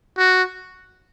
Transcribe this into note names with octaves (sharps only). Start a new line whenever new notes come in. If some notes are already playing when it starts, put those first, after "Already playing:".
F#4